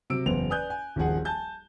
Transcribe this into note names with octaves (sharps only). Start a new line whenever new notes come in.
C3 F#3 E6 D7
F#1 E2 B4 C5 F7
B4 D5 G#5 D#6 F#6 G6
G#5
D#1 G#1 F3 G#4 F#5
G#5 A5 G6